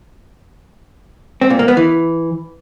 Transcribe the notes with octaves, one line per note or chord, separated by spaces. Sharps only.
C4
A#2
A#3
B3
E3